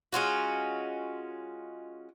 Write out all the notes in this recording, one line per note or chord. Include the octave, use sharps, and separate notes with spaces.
G#3 C#4 F4 F#4